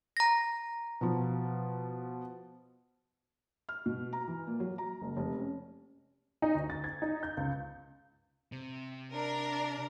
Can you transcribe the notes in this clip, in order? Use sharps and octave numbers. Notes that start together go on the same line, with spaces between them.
A#5 A#6
B2 F3
F6
B2
A#5
E3
A#2
F#3
A#5
F#1
F1
C#4
D#4
D2
A6
G#6
D#4
G6
C#2
C3
D4 A#4